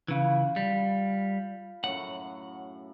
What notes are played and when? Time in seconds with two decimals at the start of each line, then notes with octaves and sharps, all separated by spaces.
0.08 C#3 E3 F4 B5
0.56 G3
1.84 F#2 A2 F#5